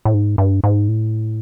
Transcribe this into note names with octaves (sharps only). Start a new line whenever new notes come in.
A2
G#2
G2
G#2
A2